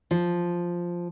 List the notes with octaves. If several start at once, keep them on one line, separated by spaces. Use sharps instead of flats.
F3